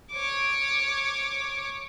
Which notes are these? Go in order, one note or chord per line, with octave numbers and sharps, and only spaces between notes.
C#5 D6